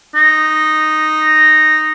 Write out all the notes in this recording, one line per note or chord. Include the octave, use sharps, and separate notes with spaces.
D#4